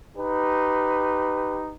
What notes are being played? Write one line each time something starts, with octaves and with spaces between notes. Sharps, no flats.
D#4 G4 B4